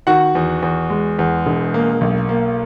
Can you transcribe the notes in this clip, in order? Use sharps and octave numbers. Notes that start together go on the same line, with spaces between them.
D#3 F#4 F#5
E2
E2
G#3
E2
E1
A#3
B1
A#3